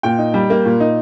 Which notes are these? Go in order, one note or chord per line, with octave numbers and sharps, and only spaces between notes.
A#2 G5
D#4
G3
A#3
A#2
D#4